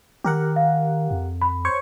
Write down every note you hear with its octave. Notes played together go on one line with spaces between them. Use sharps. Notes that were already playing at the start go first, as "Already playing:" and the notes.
D#3 G4 A#4 F#5
F5
F2
B5
C5 C#5 C#6